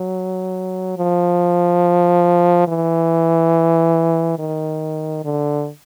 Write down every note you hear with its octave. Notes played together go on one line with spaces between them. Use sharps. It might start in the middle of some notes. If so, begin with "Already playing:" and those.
Already playing: F#3
F3
E3
D#3
D3